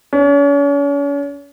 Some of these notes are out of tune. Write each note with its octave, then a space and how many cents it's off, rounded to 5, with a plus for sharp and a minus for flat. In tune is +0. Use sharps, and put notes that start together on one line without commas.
C#4 +40